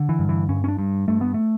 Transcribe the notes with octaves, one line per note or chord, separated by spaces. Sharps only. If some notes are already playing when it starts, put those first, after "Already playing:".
Already playing: D3
E3
G2
E3
G2 C#4
C#4
D4
G2
G2 A3
B3
A3